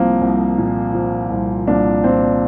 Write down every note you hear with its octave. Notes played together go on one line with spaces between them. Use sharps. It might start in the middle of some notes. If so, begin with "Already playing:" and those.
Already playing: C2 F3 A#3 C4
C2
A#2
F3
C2
C2 A#3 D4
A#2 C4